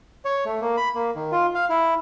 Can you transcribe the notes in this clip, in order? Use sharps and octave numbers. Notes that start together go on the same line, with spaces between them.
C#5
A3
A#3
B5
A#3
D#3
F4
F5
E4